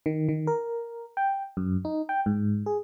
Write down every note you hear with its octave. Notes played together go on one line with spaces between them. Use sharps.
D#3
D#3
A#4
G5
F#2
D#4
G5
G#2
G#4